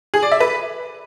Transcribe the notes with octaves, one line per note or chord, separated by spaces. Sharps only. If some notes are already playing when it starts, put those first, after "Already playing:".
G#4
D5
E5
B4